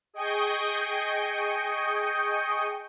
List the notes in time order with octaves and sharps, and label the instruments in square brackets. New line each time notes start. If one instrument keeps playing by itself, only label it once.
[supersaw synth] G#4 D#5 G5 C#6 D#6 G6